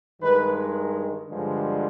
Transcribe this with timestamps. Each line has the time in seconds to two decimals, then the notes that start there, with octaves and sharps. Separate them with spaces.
0.22 G2 D#3 G#3 B4
1.28 G2 D3 F3 G#3